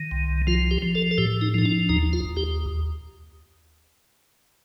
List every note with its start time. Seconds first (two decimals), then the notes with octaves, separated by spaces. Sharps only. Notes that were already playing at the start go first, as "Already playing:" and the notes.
Already playing: D#3
0.11 C2
0.47 F3 F4
0.71 G4
0.82 F3
0.95 A4
1.11 A4
1.18 A2 G4
1.41 D#4
1.54 F3 D#4
1.65 D4
1.89 D#2 D#4
2.13 F4
2.25 D#2
2.37 G4